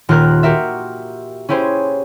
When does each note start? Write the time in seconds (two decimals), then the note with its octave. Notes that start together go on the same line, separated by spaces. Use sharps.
0.09 D#1 F4 G4 A#4 F#6
0.43 F#4 G4 A#4 E5
1.49 C#4 E4 G4 G#4 C5